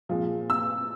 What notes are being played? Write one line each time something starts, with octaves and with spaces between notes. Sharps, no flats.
A#2 F3 G#3 C4
E6